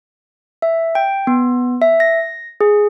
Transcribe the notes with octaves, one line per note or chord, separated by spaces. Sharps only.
E5
G5
B3
E5
A#6
G#4